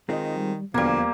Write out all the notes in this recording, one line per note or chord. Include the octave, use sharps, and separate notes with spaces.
D#3 G#3 C4 D#4 F4 D#5
G3
E2 B2 D3 F3 G3 A#3 B3 G#6